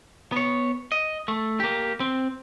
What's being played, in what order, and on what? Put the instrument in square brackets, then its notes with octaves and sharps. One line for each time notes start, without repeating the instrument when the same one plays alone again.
[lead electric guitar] B3 C#5
D#5
A3
A#3 G4
C4